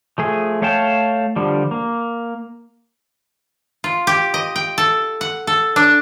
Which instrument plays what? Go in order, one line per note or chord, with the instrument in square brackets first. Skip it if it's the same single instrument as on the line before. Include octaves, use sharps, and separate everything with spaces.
[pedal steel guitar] F3 A3 G#4
A3 C#5 F5 G5 A5
D3 F3 G3
A#3
[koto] F4
G4
D#5
G5
A4
F#5
A4
D4